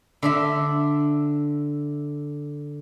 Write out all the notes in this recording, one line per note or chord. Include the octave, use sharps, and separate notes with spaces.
D3 D4 E5